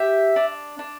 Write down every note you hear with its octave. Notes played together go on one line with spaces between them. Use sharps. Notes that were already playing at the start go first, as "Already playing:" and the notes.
Already playing: G4 E5
D4
D4